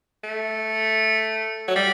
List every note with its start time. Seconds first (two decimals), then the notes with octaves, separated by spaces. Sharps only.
0.24 A3
1.68 F#3
1.75 G3